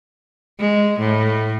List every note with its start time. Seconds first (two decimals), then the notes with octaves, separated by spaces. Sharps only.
0.60 G#3
1.00 A2